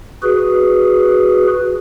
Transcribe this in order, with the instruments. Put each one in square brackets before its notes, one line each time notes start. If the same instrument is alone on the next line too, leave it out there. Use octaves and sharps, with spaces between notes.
[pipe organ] F#4 G#4 B4